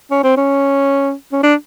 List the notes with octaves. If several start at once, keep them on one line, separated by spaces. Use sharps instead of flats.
C#4
C4
C#4
C#4
D4